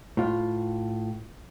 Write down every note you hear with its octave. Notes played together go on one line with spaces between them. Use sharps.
A2 F4